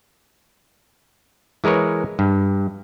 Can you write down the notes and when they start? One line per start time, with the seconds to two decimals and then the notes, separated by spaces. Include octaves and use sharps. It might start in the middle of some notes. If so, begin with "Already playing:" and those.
1.64 E3 G#3 A#4 B4 C#5
2.19 G2